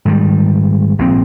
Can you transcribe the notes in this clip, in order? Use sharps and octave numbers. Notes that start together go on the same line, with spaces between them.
G#2 D#3 G3
A#1 A#2 C4